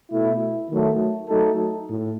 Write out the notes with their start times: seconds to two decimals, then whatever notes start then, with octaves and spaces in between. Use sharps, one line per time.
0.11 B2 A3 E4
0.70 D#3 F#3 A3
1.29 F#3 A3 D#4 A4
1.89 A2